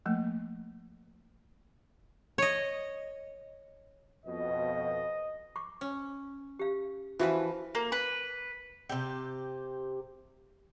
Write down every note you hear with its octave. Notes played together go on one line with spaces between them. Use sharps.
F3 A3 A#3
C#5 D#5
F2 B2 D#5
C#6 D6
C#4
G4 F5
E3 F3 C#4 E4 F#4 B4
A#3
B4
C3 G4